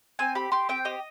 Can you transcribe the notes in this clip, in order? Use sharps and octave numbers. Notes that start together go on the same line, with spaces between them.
C4 G#5
G4 B5
G4 C6
C4 G5
G4 D#5